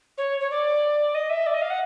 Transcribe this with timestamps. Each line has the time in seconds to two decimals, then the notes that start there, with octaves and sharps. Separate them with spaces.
0.17 C#5
0.40 C#5
0.50 D5
1.14 D#5
1.30 E5
1.46 D5
1.54 D#5
1.61 F5
1.70 F#5